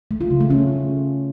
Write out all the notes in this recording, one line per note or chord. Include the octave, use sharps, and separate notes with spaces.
A3
F4
C#3
A3
C#4